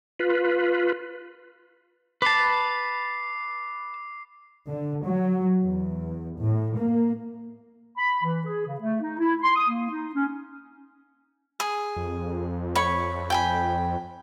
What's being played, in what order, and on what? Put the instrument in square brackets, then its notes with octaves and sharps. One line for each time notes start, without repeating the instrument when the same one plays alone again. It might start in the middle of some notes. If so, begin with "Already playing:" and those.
[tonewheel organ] F4 B4
[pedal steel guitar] B4 A5 [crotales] D6 C7
[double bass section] D3
F#3
E2
A2
A#3
[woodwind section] B5
E3
G#4
C#3
A3
D#4
E4
C6
D#6
A#3
D#4
C#4
[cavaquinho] G#4
[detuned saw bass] F2
[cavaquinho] C#5 B5 C#6
G5 G#5 B5